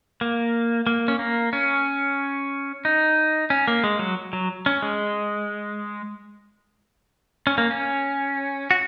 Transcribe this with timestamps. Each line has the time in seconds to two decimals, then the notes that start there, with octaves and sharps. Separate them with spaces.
0.21 A#3
0.87 A#3
1.08 C#4
1.19 A#3
1.53 C#4
2.85 D#4
3.50 C#4
3.68 A#3
3.84 G#3
3.99 F#3
4.33 F#3
4.66 C#4
4.82 G#3
7.47 C#4
7.58 A#3
7.71 C#4
8.71 F#4